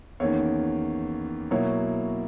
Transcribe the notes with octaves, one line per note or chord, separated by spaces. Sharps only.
E2 D#3 A#3 C#4 C#5
B2 F#3 A#3 E4 C#5